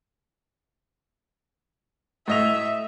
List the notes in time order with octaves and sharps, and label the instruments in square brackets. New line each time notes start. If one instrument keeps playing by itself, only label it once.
[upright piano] A2 D#5 F7 [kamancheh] E5